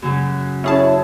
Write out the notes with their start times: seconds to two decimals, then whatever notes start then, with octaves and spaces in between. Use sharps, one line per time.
0.02 F#2 C#3 F#3
0.64 C#4 E4 G#4 C#5 A5